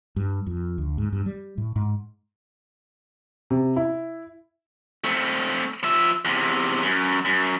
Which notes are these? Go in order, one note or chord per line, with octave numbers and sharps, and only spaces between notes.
G2
F2
D2
G#2
G2
G3
A2
G#2
C3
E4
A3 C4
F3 E5
E2 C3
F#2
F#2